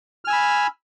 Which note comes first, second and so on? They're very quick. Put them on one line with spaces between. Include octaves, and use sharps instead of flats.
F6 G#5 E6 B5